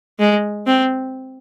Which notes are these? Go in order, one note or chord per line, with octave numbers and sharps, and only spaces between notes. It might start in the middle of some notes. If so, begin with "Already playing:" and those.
G#3
C4